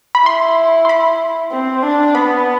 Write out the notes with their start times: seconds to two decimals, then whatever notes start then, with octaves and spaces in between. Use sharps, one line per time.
0.15 B5
0.26 E4 C6
0.85 C6
0.89 B5
1.52 C4
1.83 D4
2.14 B3 B5